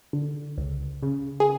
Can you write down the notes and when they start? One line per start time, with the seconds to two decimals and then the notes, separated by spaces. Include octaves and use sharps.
0.13 D3
0.58 C#2
1.03 C#3
1.40 G#4